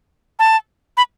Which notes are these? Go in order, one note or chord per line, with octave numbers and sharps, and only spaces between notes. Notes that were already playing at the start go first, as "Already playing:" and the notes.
A5
B5